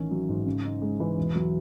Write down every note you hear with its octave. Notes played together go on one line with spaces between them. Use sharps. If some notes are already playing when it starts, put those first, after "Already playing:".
Already playing: A1 D#3 C#4
F#3
G#2
C#3
D#4
G#3
E3
E1
F#3